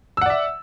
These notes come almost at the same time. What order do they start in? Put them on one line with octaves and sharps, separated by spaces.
E6 F#5 D5 E5